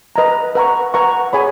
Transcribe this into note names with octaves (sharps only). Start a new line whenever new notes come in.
B4 D#5 A#5
B4 F#5 A#5 C#6
B4 F#5 A#5 C#6
G#4 C#5 G#5 B5